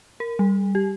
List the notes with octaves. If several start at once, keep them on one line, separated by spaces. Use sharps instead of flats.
A#4
G3
G4